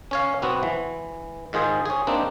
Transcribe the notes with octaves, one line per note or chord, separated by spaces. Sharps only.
C#4 C#5 F5
B1 B3 C4 F#4
E3
G#2 D#3 F4 G#4 C5
G#4 C#5
A#3 C4 D4 D#4